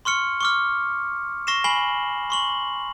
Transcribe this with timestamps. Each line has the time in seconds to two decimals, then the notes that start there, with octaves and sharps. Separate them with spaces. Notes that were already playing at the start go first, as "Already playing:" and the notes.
0.05 C6 C#6 F6 C#7
0.41 C#6 D6 F6
1.47 C#6 A#6 C7 E7
1.64 G#5 B5 C7 F#7 G7
2.30 C6 C#6 F#7